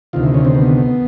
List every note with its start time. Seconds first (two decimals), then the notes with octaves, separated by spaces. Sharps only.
0.13 D2 C3 D#3 F4
0.24 E4
0.34 C#4
0.45 C4
0.55 B3